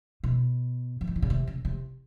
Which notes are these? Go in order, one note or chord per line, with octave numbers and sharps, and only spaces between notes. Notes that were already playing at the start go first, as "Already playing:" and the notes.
B2
E3
D#3
D3
C#3
C3
C#3
C3